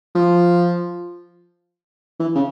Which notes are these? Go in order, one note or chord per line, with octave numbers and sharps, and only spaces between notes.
F3
E3
C#3